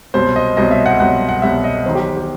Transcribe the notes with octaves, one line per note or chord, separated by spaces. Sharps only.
C2 B2 F#3 C5
D#5
C2 B2 F#3 D#5
E5
F#5
C2 B2 F#3 F#5
F#5
C2 B2 F#3 E5
D#5
E2 D#3 F#3 C5
G4
G4